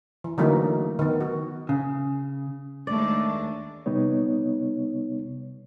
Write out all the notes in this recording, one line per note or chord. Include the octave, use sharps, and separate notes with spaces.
E3
D3 E3 F#3 A3 A#3 D#4
D#3 B3
F#4
C#3
D#2 G#3 A3 D4 D5
C3 G3 B3 D#4 C#5